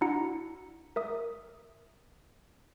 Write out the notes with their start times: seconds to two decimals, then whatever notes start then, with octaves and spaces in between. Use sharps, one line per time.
0.01 D4 E4 F#4 F#5 A#5 C#7
0.96 A#4 E5 D#6